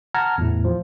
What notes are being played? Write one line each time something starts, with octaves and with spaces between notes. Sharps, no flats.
F#5 A5 A#5 F6 G#6
E2 A2
F3